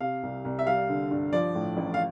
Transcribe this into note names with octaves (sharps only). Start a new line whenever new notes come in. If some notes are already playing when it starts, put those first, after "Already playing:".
C3 F5
C2
C2
E5
G3 F5
D3
G2
F3 D5
A2
A1
F5